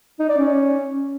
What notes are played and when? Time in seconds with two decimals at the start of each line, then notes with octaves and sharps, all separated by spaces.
0.20 D#4
0.29 D5
0.38 C#4